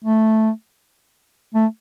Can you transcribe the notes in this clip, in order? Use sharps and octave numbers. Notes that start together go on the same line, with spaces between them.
A3
A3